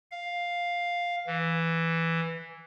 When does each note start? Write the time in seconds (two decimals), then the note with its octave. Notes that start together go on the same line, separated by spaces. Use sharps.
0.11 F5
1.27 E3